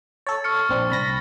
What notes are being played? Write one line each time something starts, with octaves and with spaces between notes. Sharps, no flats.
A4 C#5 A6
C#6 F6 C#7
A#1 C4 D4
C2 B5 A6 A#6